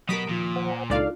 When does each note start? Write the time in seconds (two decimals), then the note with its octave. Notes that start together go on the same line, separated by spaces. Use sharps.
0.09 B2 F#3 B3 G4 A#4 D#6 B6 D7
0.29 D#2 A#2 F3 F4
0.56 C5 F#5
0.72 G#5
0.90 C#2 D4 D#4 F4 A4 D5 F5